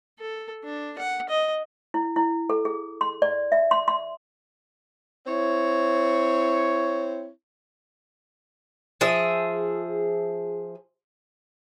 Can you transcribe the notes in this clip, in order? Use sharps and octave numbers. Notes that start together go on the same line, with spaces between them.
A4
D4
F#5
D#5
E4
E4
A4
G#4
C6
D5
E5
C6
C6
C4 E4 C#5
F3 G#4 E5